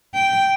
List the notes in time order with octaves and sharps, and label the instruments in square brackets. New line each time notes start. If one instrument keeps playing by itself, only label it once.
[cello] G5